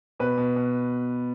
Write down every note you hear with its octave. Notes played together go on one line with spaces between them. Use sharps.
B2 B4
B2
B2